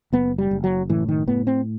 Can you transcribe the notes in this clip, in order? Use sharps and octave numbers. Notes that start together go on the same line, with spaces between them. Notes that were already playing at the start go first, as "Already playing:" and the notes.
F#1 B3
G3
F#1
F#3
A2 E3
D#3
A2 B3
C4